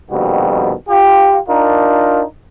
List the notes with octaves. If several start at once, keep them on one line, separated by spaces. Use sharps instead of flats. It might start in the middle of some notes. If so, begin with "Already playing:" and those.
A#1 F2 B2 D#3 G3 F#4
F4 G4
D4 D#4 F4 A#4